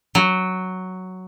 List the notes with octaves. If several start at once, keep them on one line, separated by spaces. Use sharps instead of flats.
F#3